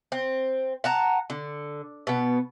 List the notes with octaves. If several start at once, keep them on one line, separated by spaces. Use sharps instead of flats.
C4
F#5 A5 A#5
D3
B2 B3